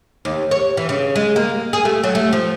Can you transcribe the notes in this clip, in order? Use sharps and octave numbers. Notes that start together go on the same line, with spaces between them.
D#2
C#5
E3
C#3
G#3
A#3
G#4
A3
F#3
A3
F3